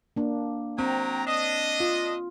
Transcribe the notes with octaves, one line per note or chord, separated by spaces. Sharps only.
A#3 D4
F#3 C4 G5 A#5
D4 D#5
F4